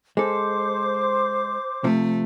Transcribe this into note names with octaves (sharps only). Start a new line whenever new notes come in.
G#3 A4 C5 D6
C3 F3 A3